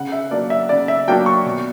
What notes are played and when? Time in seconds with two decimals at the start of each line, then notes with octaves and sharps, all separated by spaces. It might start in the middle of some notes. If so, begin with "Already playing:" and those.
Already playing: C#3 F#5
0.12 E5
0.31 F#3 A#3 D4 D5
0.50 E5
0.69 C#3 D5
0.88 E5
1.08 F#3 A#3 D4 G5
1.26 C#6
1.46 B2